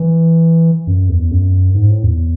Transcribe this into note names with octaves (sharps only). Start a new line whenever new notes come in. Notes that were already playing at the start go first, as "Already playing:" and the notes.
Already playing: E3
F#2
E2
F#2
G#2
A2
E2